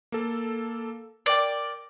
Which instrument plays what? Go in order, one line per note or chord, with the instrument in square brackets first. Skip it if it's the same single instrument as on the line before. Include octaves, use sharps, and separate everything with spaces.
[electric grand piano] A#3 A4
[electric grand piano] A#4 G5 [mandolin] D5